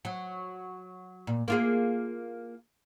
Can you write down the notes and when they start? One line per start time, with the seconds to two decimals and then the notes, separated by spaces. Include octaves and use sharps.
0.05 F#3
1.27 A#2
1.48 A#3 F4 G#4